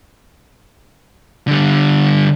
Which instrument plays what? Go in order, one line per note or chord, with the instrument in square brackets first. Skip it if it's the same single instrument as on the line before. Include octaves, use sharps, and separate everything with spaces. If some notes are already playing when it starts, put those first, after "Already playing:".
[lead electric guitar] D3 G3